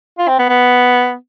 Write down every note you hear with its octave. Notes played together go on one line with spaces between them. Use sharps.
F4
C4
B3
B3